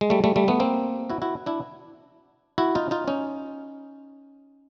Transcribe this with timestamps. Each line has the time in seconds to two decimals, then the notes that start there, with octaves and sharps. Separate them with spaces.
0.01 G#3
0.10 G3 A3
0.24 G3 A3
0.36 G3 A3
0.48 A3 B3
0.60 A#3 C4
1.10 E4 F#4
1.22 E4 F#4
1.46 D4 E4
2.58 E4 F#4
2.75 D#4 F4
2.91 D#4 F4
3.08 C#4 D#4